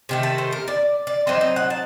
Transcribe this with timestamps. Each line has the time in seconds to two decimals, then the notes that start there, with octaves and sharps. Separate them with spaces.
0.09 C3 D#3 A3
0.23 A5
0.38 C5
0.52 A#4
0.68 D5
1.07 D5
1.27 F#3 C4 D#4 D#5
1.41 D#5
1.56 F#5
1.70 A5